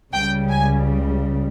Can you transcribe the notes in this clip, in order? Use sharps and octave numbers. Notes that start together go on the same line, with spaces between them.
C#2 C#3 G3 G5
G#5